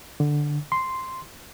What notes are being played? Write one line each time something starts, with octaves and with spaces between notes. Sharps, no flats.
D3
C6